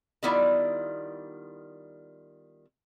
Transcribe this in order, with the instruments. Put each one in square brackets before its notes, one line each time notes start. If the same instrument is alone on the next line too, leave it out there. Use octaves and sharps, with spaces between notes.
[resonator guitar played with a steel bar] D#3 G3 B3 E4 F4 D5